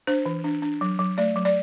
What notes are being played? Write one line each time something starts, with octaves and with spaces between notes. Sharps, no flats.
D4 C5
E3
D4
D4
F#3
F#3
A3 D5
F#3
D5